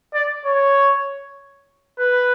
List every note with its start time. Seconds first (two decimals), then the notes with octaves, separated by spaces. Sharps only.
0.14 D5
0.45 C#5
1.99 B4